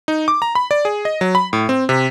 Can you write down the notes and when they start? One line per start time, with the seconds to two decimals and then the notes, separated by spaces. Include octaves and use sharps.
0.08 D#4
0.28 D6
0.42 A#5
0.55 B5
0.71 D5
0.85 G#4
1.05 D#5
1.21 F#3
1.35 B5
1.53 A2
1.69 C4
1.89 C3